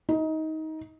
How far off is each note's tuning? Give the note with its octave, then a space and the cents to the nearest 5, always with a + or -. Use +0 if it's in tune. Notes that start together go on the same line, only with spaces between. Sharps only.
D#4 +20